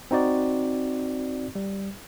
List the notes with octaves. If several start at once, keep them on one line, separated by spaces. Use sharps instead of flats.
C4 D#4 F#4 D5
G3